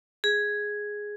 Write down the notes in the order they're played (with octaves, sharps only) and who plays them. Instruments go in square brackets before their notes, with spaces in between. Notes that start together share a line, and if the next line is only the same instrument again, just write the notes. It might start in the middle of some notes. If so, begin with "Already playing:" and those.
[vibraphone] G#4